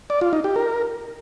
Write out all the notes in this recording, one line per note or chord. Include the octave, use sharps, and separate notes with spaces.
D5
F4
D#4
G4
A#4